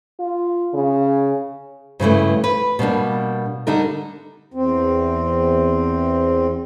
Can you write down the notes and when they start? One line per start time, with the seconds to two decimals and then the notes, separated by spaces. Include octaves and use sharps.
0.20 F4
0.74 C#3
2.00 G2 C#3 E3 A3
2.44 B4
2.79 B2 G3 A#3 D4
3.67 D3 G3 D#4 A#4
4.54 E2 C4